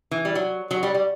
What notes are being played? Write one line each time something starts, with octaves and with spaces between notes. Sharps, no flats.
E3
G3
F#3
F#3
G3
G3